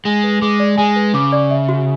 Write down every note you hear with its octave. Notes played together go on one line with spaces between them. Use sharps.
G#3 G#5
B4
G#3 D6
D5
G#3 G#5
B4
C#3 D6
D5
E5
F#4